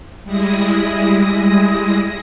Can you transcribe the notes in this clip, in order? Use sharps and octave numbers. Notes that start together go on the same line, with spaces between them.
G3 G#3 E4 D#6 A#6